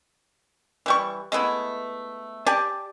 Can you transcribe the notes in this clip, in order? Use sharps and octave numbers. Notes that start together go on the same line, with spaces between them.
E3 G3 C#6
G#3 A3 B3 E4
G4 D5 G#5 A5